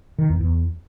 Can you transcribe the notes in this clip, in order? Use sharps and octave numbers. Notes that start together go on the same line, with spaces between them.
D#3
E2
E2